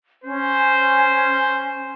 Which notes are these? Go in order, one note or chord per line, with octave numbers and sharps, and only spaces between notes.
C#4 C5